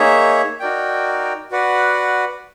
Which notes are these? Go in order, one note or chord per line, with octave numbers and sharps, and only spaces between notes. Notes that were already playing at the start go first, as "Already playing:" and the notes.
Already playing: A#3 D#4 G#4 C#5 E5
D#4 F#4 A#4 D5 G5
F#4 B4 D5 F#5